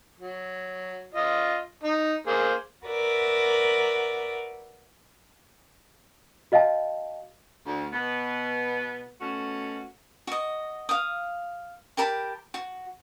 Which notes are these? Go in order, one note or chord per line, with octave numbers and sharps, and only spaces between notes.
F#3
F4 D#5
D#4
A#3 G#4 C5
F#4 A#4 B4 D5 E5
F#4 D#5 F5 G5 A5
D2
B2 B3
B2 A3 C#4 F#4
F#4 D#5
F5 D#6
G4 A#4 A5 B5
F#4